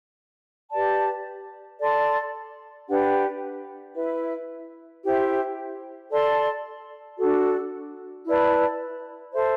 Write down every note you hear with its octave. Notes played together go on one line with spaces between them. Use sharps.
G4 B4 D5 A5
A4 D5 A5 C6
D4 G4 B4 F#5
E4 B4 E5
E4 G4 C5 E5
A4 D5 A5 C6
D4 F#4 A4
E4 B4 D5 A5
A4 C5 E5